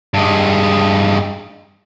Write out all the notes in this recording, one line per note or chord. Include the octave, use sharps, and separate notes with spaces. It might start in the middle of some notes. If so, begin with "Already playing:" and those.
G2 G#3